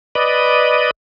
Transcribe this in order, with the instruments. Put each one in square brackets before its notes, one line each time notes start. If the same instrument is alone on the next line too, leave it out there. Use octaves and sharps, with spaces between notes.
[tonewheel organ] B4 D5 D#5